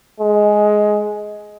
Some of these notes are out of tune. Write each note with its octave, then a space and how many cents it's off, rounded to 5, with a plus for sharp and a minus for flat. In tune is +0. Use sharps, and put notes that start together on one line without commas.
G#3 +10